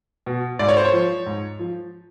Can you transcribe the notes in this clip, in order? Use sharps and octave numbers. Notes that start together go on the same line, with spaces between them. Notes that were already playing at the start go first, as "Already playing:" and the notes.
B2
G#2 D5
C#5
C5
C#5
F3
G#2
F3